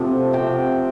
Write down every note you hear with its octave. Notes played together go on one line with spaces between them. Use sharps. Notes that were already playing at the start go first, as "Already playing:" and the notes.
Already playing: C3 F3 A3 F#5
C3 G5